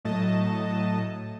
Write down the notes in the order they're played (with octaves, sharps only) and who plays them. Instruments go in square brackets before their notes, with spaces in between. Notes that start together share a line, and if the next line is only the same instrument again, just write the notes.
[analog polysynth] A2 F#3 A3 D#5 A5